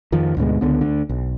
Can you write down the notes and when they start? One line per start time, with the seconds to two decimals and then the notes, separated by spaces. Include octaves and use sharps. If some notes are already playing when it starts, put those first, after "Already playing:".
0.12 F2 D#3 F3
0.37 D2 G#2 B2 G#3
0.61 C#2 D3 B3
0.81 D2 D3
1.09 B1